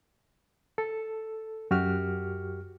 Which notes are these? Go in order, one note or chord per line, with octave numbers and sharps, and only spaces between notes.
A4
F#2 F#4 G4 F6